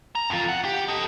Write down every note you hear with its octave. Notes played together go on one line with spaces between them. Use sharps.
A#5
F2 F4
F#5
G4
A4 D#5